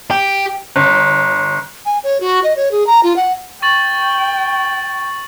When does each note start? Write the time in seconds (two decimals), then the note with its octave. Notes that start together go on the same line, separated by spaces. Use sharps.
0.11 G4
0.76 G1
1.86 G#5
2.04 C#5
2.21 F#4
2.44 D#5
2.56 C#5
2.71 G#4
2.87 A#5
3.03 F4
3.16 F#5
3.62 G5 C#6 A6 F#7